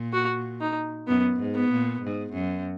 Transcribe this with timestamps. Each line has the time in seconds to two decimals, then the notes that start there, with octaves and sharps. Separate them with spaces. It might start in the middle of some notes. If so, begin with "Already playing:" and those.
Already playing: A#2
0.13 F#4
0.61 D#4
1.08 F#2 B3
1.40 G#2
1.55 B3
1.71 A#2
2.02 G#2
2.33 F#2